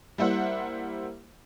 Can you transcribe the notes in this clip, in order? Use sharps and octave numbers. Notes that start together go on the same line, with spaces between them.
G3 A#3 E4 C5 E5 F#5